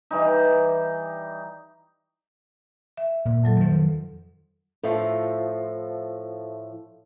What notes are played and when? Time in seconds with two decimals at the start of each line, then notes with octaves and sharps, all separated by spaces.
0.11 E3 G3 D#4
2.97 E5
3.25 A#2
3.44 F2 F#3 A4
3.56 D#3 F3
4.84 A2 F3 A4 E5